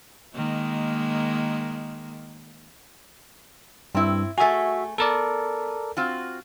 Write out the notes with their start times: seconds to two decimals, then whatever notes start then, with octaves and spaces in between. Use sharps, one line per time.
0.35 D#3 G#3 A#3
3.95 G2 C4 E4
4.38 A3 F#4 G#4 E5 G#5
4.98 B3 A4 A#4 D5
5.97 C4 F4 F#4